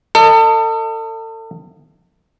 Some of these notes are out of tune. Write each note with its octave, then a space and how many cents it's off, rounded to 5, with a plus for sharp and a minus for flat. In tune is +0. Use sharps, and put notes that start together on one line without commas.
A4 +35 D#5 +0